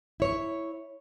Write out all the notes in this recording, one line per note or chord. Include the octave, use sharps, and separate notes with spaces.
E4 C#5